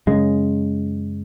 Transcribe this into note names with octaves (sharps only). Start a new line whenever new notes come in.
F#2 C#3 G#3